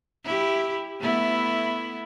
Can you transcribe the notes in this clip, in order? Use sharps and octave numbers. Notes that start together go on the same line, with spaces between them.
E4 G4
A3 B3 E4